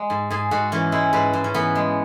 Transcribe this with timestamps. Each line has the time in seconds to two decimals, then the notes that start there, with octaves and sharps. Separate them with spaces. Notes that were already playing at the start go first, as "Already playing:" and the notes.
Already playing: G#3
0.10 G#2
0.30 G#2 G#4
0.51 G#2 F#4
0.72 E3 C#4
0.92 G#3 E4
1.13 G#2 B4
1.33 G#2
1.44 C#4
1.54 E3 B3
1.75 G#3